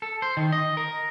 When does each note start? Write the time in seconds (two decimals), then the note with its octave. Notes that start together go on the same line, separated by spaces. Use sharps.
0.02 A4
0.22 C5
0.37 D#3
0.52 D#5
0.77 A#4